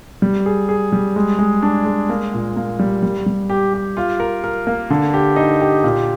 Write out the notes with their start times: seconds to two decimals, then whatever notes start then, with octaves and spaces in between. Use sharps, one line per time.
0.22 G3
0.46 G#4
0.69 G#4
0.93 G3
1.16 G#3
1.39 G#3
1.62 D4
1.85 G#3
2.09 A#3
2.33 A#2
2.56 A#3
2.80 G3
3.03 G3
3.26 G3
3.50 G4
3.74 G4
3.97 F4
4.20 A#4
4.44 A#4
4.67 A#3
4.90 D3
5.14 G4
5.36 D#4
5.61 G4
5.84 A#2